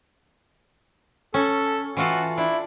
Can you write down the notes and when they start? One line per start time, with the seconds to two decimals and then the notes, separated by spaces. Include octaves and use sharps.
1.34 C#4 A4
1.97 E3 F4 F#4 A4
2.38 D4 E4